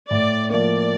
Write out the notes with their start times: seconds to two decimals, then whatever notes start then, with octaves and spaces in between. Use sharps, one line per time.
0.10 A2 D5
0.50 F3 A#3 D5